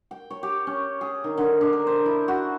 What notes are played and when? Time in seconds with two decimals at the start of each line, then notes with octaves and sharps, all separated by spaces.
0.11 G5
0.30 C#5
0.43 G4
0.67 C#4
1.01 G#4
1.24 D#3
1.38 D3
1.61 D4
1.73 A#4
1.87 C5
2.06 E4
2.28 F#4